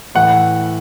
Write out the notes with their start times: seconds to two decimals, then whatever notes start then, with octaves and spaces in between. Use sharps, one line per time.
0.15 A2 E3 F#5